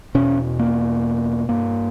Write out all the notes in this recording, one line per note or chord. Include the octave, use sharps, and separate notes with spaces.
E2 B2 C#4
A#3
G2 A#3